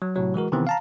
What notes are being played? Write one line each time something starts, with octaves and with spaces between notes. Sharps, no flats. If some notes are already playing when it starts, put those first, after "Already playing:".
F#3
A2 C3 F#3
E3 G#3 F#4 A#4
C3 D#3 E3 B3 C4
F5 A5 A#5